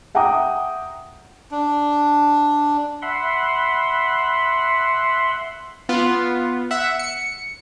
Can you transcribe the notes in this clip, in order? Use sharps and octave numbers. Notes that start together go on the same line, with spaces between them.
E5 F#5 G5 A#5 D6 D#6
D4
E5 F#5 B5 C6
B3 F4
E5 F#5
C#7